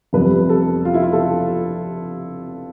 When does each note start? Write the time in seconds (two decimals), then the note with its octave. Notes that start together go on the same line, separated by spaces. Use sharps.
0.13 F1 F2 C3 G3 B4
0.49 A4
0.85 F4
0.94 E4
1.03 F4
1.13 A4